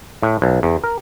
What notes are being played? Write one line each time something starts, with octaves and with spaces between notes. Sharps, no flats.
A2
B1
E2
A#4